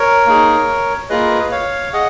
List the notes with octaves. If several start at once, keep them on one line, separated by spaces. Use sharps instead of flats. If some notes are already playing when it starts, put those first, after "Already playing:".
Already playing: A#4 C#5
A#3 D#4 G#4
A#3 F4 G#4 B4 D#5
C#5 F5
G#4 D#5 F#5